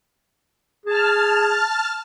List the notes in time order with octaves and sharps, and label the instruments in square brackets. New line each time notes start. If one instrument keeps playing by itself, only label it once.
[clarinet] G#4 [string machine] A5 F6